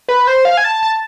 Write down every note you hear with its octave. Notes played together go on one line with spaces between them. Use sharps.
B4
C5
F5
G#5
A5
A5